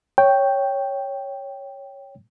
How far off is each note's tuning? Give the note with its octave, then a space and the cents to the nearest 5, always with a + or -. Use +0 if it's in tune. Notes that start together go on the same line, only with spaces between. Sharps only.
C#5 +0 G5 +0